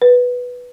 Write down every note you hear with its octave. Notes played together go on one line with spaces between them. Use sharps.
B4